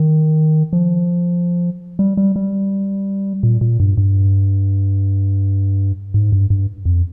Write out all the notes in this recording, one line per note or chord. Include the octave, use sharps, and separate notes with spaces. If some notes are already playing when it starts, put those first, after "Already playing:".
Already playing: D#3
F3
G3
G3
G3
A#2
A#2
G2
G2
G#2
G2
G2
F2